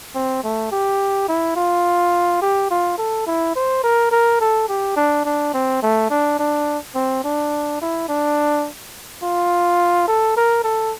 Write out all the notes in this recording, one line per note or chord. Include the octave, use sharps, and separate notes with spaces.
C4
A3
G4
E4
F4
G4
F4
A4
E4
C5
A#4
A#4
A4
G4
D4
D4
C4
A3
D4
D4
C4
D4
E4
D4
F4
A4
A#4
A4